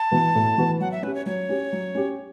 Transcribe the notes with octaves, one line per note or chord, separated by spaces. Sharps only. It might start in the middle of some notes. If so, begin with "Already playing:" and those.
Already playing: A5
E3 B3 F#4 B4
A2
E3 B3 F#4 B4
F#3 F#5
E5
C#4 G4 B4
C#5
F#3 C#5
C#4 G4
F#3
C#4 G4